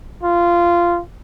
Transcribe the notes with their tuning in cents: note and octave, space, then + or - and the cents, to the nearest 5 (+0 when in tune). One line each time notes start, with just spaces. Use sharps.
F4 -15